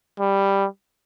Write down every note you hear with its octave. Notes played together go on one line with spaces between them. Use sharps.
G3